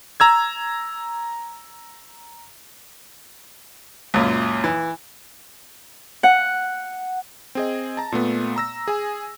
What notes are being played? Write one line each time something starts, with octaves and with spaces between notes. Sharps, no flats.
A#5 E6 G#6
C#2 F#2 A#2
E3
F#5
C4 G#4 D#5
A5 A#5
A#2 A3 B3
A#5 E6 A#6
G#4 G#5